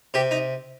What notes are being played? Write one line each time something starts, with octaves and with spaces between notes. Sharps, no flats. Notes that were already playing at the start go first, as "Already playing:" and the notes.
C3 G4
D#4